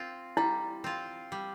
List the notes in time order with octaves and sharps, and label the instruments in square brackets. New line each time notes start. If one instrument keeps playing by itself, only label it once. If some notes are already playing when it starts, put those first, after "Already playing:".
Already playing: [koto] C4 F4
[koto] G3 [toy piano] E4
[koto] C4 F4
G3